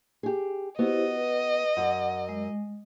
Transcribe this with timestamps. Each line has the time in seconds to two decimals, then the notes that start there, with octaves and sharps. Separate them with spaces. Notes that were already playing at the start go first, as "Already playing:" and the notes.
0.23 G4 G#4
0.79 B3 E4 F#4 G4 C5 D#5
1.15 B4
1.77 F#2 F#5
2.29 G#3